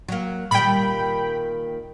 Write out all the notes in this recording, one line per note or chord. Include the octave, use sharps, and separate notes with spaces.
F#3 A#3
A#2 D#3 G3 G5 B5